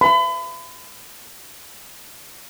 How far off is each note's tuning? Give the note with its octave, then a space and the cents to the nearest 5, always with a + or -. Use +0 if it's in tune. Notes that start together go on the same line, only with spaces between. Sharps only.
B5 +40